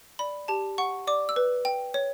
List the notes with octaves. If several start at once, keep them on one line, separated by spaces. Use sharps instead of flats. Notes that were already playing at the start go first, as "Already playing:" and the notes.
D5 B5
G4 A5
F#5 C#6
D5 D6
E6
B4
G5
C#5